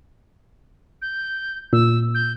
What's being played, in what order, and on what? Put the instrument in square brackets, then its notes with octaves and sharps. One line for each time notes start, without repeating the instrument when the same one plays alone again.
[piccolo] G6
[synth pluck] A#2 [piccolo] E6
[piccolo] G6